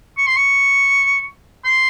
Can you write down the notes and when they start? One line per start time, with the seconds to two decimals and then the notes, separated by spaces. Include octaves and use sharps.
0.17 C#6
0.27 C6
0.36 C#6
1.65 C6